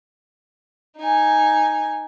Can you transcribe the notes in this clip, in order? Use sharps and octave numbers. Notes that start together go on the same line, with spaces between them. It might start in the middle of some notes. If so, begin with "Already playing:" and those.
D#4 G#5